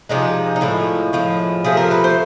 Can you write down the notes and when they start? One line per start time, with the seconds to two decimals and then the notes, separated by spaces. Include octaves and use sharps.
0.09 C3 F3 G#3 D#4
0.56 D#4
0.61 A2 F3 G#3 E4
1.13 A2 F3 G#3
1.64 C3 F3 A3 G#4
1.77 A#4
1.91 B4
2.04 C5